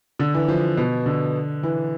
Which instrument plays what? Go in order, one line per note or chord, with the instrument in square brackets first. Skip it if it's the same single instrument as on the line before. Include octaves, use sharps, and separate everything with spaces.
[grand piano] D3
E3
F3
B2
D3
E3